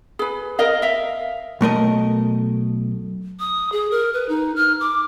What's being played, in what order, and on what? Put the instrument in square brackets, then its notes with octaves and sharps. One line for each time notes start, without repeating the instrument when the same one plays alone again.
[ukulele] G#4 B4
A#4 D#5 F5
E5 F5
[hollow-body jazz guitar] B1 A3 A#4 D#5
[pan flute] D#6
G#4
A#4
B4
D#4
F6
D6